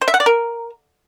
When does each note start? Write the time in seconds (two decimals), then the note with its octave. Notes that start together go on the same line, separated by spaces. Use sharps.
0.01 C5
0.08 E5
0.14 F#5
0.20 D5
0.26 A#4